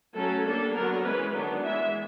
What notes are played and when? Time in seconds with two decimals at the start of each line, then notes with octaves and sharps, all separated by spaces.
0.14 F#3 A3 C#4 A4
0.45 G3 A#3 D4 A4
0.74 D3 F#3 B3 A#4
1.05 E3 G#3 C#4 B4
1.34 D#3 F#3 B3 D4
1.64 E3 G#3 B3 E5